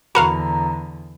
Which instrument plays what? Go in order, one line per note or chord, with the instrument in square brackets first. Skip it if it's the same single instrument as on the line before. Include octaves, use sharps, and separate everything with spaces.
[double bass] E2 D3 [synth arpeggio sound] F#4 A#4 F5 [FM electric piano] A#5 [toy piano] B5